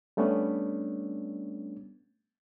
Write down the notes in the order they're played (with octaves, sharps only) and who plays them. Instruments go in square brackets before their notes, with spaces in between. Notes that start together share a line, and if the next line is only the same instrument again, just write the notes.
[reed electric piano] G3 A3 B3 C#4 D4